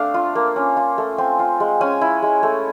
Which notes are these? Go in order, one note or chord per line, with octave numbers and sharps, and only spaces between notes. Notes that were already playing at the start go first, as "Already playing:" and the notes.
Already playing: A3 C4 D4 F5
F4
A#3
C#4
F4
A3
C4 G#5
F4
G#3
C#4 G#5
E4
G#3
A3